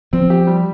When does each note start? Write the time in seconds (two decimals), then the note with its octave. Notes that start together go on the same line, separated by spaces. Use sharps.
0.13 F3 C4
0.30 G4
0.47 G3